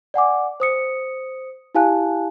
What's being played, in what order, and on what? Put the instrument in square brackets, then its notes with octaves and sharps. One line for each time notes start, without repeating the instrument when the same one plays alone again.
[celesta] D5 F#5 G#5 D6
C5 D#6 C#7
E4 G4 F5 G#5 A5 F#6